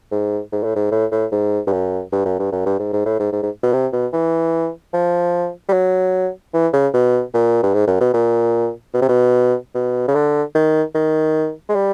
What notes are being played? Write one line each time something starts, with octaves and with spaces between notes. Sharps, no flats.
G#2
G#2
A2
G#2
A2
A2
G#2
G2
F#2
G2
F#2
G2
F#2
G2
G#2
G#2
A2
G#2
G#2
G#2
B2
C3
B2
E3
F3
G3
F#3
E3
C#3
B2
A#2
G2
G#2
F#2
B2
A#2
B2
C3
B2
B2
C#3
D3
D#3
D#3
G#3
G3